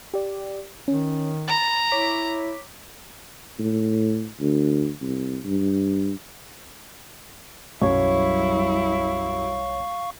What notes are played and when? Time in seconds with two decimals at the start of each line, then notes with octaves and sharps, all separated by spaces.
0.14 G4 D5
0.88 D#3 C#4
1.48 A#5 B5 A6
1.91 E4 C#5 D6 B6
3.59 A2
4.40 D2
5.01 C2
5.44 G2
7.82 B1 F#2 G3 E4 C#5 F5 C#6